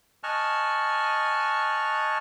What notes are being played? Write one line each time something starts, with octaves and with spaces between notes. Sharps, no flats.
D#5 G#5 A5 C#6 F6 F#6